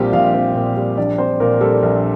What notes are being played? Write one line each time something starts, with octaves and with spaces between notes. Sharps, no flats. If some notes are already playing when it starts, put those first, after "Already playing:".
Already playing: A#1 A#2 G3 C4 F4 G4
A#1 F4 F5
C4
A#2
G3
A#1 D4 D5
C4 C5
A#2 A#3 A#4
G3 A4
A#1